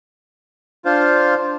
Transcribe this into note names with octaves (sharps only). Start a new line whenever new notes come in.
D4 F4 C5 F5